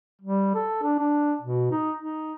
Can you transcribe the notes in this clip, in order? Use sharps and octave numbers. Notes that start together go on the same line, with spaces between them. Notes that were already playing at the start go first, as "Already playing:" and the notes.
G3
A4
D4
D4
B2
D#4
D#4